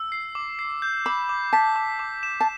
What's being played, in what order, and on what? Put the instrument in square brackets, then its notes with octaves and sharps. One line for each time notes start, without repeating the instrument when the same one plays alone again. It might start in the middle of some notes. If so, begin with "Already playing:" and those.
Already playing: [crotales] E6
C7
D6
C7
G6
[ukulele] B5 [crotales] D6
[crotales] D6
[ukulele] A5 [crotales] B6
[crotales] D6
D6
E7
[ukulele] A5